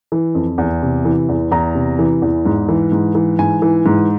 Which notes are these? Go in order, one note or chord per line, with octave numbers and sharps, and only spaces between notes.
E3
F2
E2
C3
E3
E2
E2 A#5
C3
E3
E2
G#2
E3
G#2
E3
G#2 G#5
E3
G#2